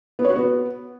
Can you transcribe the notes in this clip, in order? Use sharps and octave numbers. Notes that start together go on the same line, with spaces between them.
B3
C#5
F#4
B3